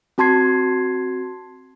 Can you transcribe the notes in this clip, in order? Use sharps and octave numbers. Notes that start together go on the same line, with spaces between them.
C4 F#4 A5 C6 G#6 C7